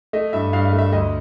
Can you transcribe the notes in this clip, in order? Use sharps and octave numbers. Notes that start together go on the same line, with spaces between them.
A3 D#5
G2 E5
G2 F5
F5
A3
E5
D2 D#5